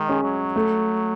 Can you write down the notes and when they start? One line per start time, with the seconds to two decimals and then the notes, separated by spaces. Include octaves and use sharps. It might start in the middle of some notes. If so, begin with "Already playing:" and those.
Already playing: D#3 G#3
0.09 C#4 G#4
0.24 F#3
0.56 A3